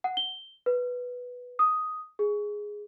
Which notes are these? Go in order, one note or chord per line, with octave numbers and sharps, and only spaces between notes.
F#5
G7
B4
D#6
G#4